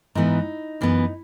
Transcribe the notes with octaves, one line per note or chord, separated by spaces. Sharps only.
G#2 E3 B3 D#4
F#2 E3 B3